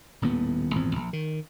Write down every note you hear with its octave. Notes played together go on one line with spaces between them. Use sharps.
D#1 D#2 A2 B3
G#1 E2 A#2 C4
A#1
D#3